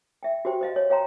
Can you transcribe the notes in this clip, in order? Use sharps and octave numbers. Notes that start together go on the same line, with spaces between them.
E5 G5
F#4 G4 C5 G5
C5 D#5 F5
C#5
C#5 F5 G5 A#5 C6